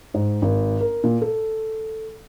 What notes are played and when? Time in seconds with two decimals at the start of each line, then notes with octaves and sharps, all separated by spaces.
0.14 G#2
0.42 G#1
0.81 A#4
1.04 A#2
1.22 A4